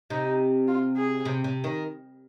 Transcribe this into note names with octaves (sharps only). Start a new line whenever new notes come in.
C3 D#4
F4
G#4
C3
C3
D#3